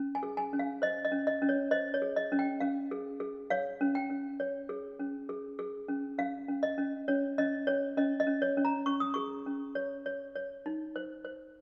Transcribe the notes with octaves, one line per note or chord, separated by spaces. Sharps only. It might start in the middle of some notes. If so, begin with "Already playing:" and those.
Already playing: C#4
G#5
G#4
G#5
C#4
F5
C5 D#5
D#5
C#4
D#5
C#4
C#5
C5 D#5
C#5
G#4
D#5
C#4
G5
C#4 F5
G#4
G#4
C#5 F5
C#4
G5
C#4
C#5
G#4
C#4
G#4
G#4
C#4
C#4 F5
C#4
D#5
C#4
C#4 C#5
C#4 D#5
C#4 C#5
C#4 D#5
D#5
C#4
C#5
C#4
A#5
C#4 C#6
D#6
G#4 C#6
C#4
C#5
C#5
C#5
D#4
C5
C5